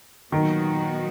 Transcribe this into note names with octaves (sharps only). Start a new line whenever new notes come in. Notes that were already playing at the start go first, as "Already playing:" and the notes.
A#2 D#3 F#3 B3 D#4 F#4